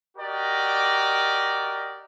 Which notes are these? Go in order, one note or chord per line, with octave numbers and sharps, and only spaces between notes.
F#4 G4 A#4 D5 D#5